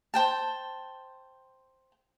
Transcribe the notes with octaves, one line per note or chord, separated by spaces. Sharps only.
C5 G5 A5